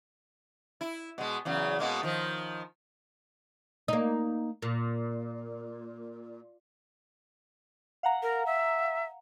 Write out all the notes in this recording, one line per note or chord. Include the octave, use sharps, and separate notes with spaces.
E4
B2 G#3
E2 C#3 F#3
B2 G#3 A#3
D#3 F3
A#3 D#4
A#2
F5 F#5 A#5
A#4
E5